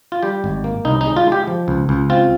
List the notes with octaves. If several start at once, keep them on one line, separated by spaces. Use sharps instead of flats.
F4
G3 G4
G#1
A#3
C2 D#4
D#4
G#3
F4
G#3
G4
F3
C#2
C#2
C4 F4